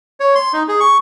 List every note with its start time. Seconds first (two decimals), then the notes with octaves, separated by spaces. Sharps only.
0.20 C#5
0.35 C6
0.53 D#4
0.68 G#4
0.80 C#6